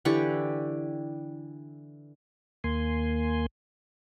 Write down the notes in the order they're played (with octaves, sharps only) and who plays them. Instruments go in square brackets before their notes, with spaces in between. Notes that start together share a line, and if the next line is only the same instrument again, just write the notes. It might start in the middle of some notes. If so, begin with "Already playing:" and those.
[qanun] D3 E3 G4 C#6
[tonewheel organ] D#2 A#3 G#5 C6